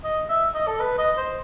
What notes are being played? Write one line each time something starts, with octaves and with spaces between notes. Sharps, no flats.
D#5
E5
D#5
A4
B4
D#5
C5